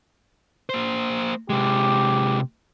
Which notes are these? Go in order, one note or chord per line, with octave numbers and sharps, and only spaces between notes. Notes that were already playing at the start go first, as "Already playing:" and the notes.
A#3 C5
C3 G#3 G4